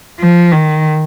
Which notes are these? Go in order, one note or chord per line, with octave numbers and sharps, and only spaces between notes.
F3
D#3